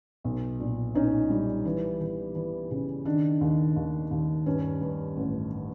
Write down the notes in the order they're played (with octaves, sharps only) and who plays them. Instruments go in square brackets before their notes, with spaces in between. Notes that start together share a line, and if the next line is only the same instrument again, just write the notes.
[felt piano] B1
A#2
B1 C#4 D#4
G3
E3
E3
E3
C#3
D#3 D4
D#2
D#2
D#2
G2 C#4
G2
A1